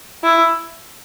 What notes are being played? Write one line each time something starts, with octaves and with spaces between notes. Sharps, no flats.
E4